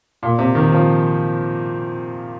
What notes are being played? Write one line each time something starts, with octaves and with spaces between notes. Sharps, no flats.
A#2
C3
D#3
F3